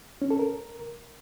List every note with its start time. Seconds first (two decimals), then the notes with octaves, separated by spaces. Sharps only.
0.22 C#4
0.31 A4
0.39 A#4